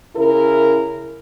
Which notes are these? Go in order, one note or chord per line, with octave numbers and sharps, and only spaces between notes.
C#3 E4 A#4